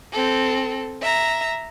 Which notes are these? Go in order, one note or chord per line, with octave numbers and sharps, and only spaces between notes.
C4 A4
E5 A#5